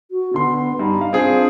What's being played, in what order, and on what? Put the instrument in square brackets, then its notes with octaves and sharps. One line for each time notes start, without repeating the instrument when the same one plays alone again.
[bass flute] F#4
[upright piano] D3 C6 [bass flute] B3
[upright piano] G2 [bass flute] D#4
[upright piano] F5
[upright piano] C4 F4 G#4 [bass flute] D4